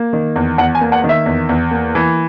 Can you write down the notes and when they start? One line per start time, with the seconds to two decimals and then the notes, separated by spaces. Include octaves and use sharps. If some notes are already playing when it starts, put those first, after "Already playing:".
Already playing: A#3
0.13 D#3
0.36 E2
0.58 E2 F#5
0.75 G#5
0.81 A#3
0.92 F#5
1.04 D#3
1.09 E5
1.26 E2
1.49 E2
1.71 A#3
1.95 E3